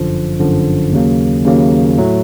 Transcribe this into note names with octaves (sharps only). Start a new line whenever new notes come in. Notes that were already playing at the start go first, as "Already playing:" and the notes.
Already playing: G1 F#2 D3 F3
G1 F#2 D3 F3
D#2 C#3 F#3 A#3
D#2 C#3 F#3 A#3
A2 F#3 A3